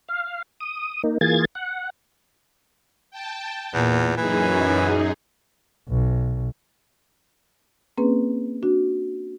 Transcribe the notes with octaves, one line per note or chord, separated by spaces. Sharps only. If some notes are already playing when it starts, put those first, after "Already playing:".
F5
D#6
A#3 D#4
E3 A#3 F4 G#4 G#6 A6
F#5
G5 A5
E2 A#2
F#2 E3 D#4 G#4
B1
A#3 C4 C#4 G#4 B4
D4 F#4